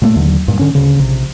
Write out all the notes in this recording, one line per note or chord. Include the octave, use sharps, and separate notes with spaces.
A#2 G3 A3
D#2 D3 F#3
G2 A#2
D3 C#4
D2 C#3
A#1 C3